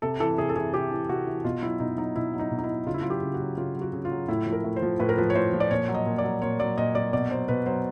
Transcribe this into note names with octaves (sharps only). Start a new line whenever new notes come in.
C3 A4
E3 A4
C3 G#4
A4
E3 G#4
C3 G4
E3
C3 F#4
E3
B2 F4
F#3 E4
B2 D#4
F#3 D#4
B2 E4
F#3
D#4
B2
D#4
E4
F#3
C#3 F4
E4
F4
F#3
G4
C#3
F#4
F#3
C#3 F4
F#3
F#4
C#3
F4
F#3
A2 E4
F3
A#4
A2
C5
F3
A2 B4
A#4
F3 B4
C#5
A2 C5
F3
D5
A#2 C#5
F#3
D#5
A#2
D5
F#3
A#2 C#5
F#3 D5
A#2 D#5
F#3 D5
B2 D5
F#3 C5
B2 B4
F#3 C5